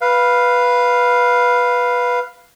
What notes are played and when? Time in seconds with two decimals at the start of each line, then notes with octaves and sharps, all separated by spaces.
0.01 B4 F5